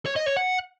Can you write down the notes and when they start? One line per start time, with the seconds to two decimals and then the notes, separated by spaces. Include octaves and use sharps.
0.06 C#5
0.16 D#5
0.26 C#5
0.37 F#5